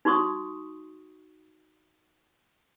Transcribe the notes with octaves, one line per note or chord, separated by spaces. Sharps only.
D#4 F#4 C6 C#6 D#6